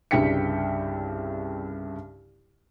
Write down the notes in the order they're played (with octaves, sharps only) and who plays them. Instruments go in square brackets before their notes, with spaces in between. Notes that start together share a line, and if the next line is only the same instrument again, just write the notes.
[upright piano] C2 G2 C#3 G5 B6 C#7